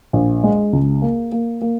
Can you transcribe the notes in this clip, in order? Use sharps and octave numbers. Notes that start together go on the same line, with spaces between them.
A#1
G#3
C#2
A#3
A#3
A#3